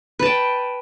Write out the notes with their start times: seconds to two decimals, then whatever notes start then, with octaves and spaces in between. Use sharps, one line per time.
0.19 B4
0.22 A5
0.26 G5